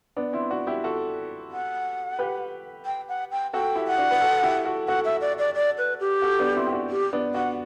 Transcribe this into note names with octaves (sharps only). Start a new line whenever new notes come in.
B3 D4
C4 E4
D4 F#4
E4 G4
F#4 A4
F#5
G4 B4
G5
F#5
G5
F#4 A4 G5
E4 G4
F#5
D4 F#4
B4
F#4 A4
E4 G4
F#4 A4
F#4 A4 F#5
E5
D5
D5
D5
B4
G4
F#4 A4
B3 D4
C4 E4
G4
D4 F#4
G4
B3 D4
D4 F#4 F#5